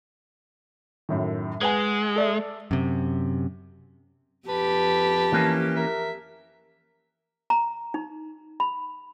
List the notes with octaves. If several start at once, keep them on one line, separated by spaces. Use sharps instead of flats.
F#2 A2 D#3
G#3 B4 F#5 G#5
A4 D5 E5
F#2 C3
F2 G4 B4 A5
E3 A#3 C#4
A#4 E5
A#5
D#4
B5